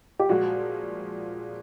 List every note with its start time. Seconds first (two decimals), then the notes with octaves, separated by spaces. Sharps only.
0.20 G4
0.29 A#2 F3 G#3 F#4